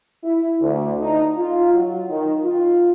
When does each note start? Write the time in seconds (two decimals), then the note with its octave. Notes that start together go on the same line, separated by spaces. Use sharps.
0.24 E4
0.60 D2
1.00 D#4
1.37 F4
1.74 F#3
2.09 D#3
2.43 F4